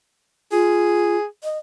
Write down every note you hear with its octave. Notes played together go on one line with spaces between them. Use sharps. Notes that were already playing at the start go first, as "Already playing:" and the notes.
F4 G#4
D#5